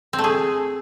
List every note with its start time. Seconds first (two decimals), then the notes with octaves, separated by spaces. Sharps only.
0.13 C4
0.19 A3
0.24 G#4